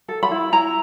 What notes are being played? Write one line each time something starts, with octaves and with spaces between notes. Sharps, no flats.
A4
B5
E4
E4 A#5